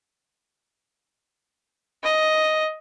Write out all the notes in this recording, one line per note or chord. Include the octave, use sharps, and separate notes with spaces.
D#5